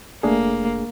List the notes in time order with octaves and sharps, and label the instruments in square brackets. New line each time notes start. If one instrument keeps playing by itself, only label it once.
[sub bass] F1 [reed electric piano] A3 D4 G#4 [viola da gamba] A#3